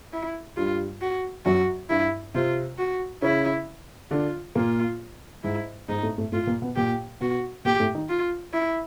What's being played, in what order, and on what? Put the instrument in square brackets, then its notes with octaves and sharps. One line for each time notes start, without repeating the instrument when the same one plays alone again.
[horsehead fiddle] E4
[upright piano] G2 G3 [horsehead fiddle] F4
[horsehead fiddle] F#4
[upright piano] F#2 F#3 [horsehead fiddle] F#4
[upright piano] G2 G3 [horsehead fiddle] E4
[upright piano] C3 C4 [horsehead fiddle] F4
[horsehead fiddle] F#4
[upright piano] C#3 C#4 [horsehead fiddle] E4
[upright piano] D3 D4 [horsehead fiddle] F4
[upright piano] A#2 A#3 [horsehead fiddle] F4
[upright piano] G#2 G#3 [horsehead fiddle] E4
[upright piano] G#2 G#3 [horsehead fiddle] D#4
[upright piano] A2 A3
A2 A3
[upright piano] A2 A3 [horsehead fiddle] F4
[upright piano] A#2 A#3
B2 B3
[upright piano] A#2 A#3 [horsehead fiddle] G4
[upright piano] B2 B3 [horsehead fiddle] F#4
[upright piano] A#2 A#3 [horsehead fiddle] G4
[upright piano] A2 A3
D#3 D#4
[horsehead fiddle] F4
E4